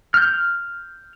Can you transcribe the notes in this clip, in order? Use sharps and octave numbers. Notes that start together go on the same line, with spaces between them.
F6 G6